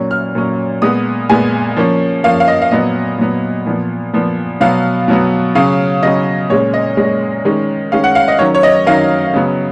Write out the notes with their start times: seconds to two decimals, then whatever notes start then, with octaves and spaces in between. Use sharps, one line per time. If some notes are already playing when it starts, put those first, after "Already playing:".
Already playing: A#2 F#3 C#4
0.11 F6
0.35 A#2 F#3 C#4
0.82 A#2 G#3 B3 D#6
1.30 A#2 G#3 B3 G#5
1.77 F3 A#3 C#4
2.24 F3 A#3 C#4 F5
2.40 F5
2.48 D#5
2.62 F5
2.71 A#2 F#3 B3 D#5
3.18 A#2 F#3 B3
3.66 A#2 F3 B3
4.13 A#2 F3 B3
4.60 B2 F#3 B3 F5
5.08 B2 F#3 B3
5.55 C#3 F#3 C#4 F5
6.03 C#3 F#3 C#4 D#5
6.50 A#2 G#3 C#4 C#5
6.74 D#5
6.97 A#2 G#3 C#4
7.45 D#3 G#3 C#4
7.92 D#3 G#3 C#4 F5
8.04 F#5
8.15 F5
8.28 D#5
8.39 D#3 F#3 C#4 C#5
8.54 C#5
8.63 D#5
8.87 D#3 F#3 C#4 F5
9.34 C#3 F#3 B3